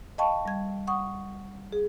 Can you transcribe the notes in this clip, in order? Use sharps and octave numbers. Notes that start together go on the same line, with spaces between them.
D#5 F5 G5 A5 B5 C#6
G3 G#6
F#5 C#6 D#6
G#4